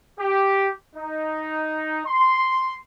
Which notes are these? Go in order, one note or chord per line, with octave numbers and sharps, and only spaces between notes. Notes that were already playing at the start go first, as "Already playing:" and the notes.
G4
D#4
C6